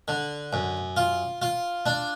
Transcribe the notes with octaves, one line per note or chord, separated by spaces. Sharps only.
D3
F#2
F4
F4
D4